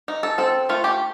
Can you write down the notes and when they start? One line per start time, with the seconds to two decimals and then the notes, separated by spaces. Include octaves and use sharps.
0.08 D#4
0.23 A4
0.38 C4 A4
0.69 A3 F4
0.84 G4